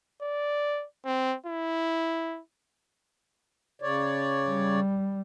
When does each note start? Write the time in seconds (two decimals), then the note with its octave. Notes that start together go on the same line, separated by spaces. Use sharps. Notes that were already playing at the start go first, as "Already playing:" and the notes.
0.22 D5
1.06 C4
1.46 E4
3.82 C#3 C#5 D5
4.47 G3